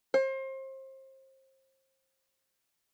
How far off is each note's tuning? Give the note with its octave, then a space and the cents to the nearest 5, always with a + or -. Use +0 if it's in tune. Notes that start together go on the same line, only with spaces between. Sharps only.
C5 +30